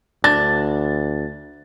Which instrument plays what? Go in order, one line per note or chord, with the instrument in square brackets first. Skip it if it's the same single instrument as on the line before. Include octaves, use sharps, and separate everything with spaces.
[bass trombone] D2 [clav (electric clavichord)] D4 [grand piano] A6